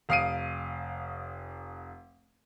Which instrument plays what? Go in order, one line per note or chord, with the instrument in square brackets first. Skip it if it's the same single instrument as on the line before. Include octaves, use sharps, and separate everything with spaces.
[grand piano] F1 F5 D#6 C7 D7 D#7